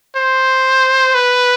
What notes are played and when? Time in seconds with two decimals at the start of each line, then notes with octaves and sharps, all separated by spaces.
0.16 C5
1.15 B4